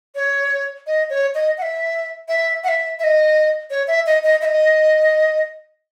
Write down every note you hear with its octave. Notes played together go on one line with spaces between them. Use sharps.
C#5
D#5
C#5
D#5
F#5
E5
E5
F#5
E5
E5
D#5
C#5
E5
D#5
D#5
E5
D#5